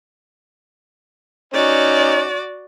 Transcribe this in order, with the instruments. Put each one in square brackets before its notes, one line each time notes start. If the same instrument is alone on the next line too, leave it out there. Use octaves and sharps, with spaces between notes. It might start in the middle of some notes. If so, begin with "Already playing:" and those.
[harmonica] C#4 D#4 [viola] F#4 D5